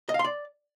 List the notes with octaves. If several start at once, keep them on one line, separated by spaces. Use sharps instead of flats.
D#5
F5
C6
D5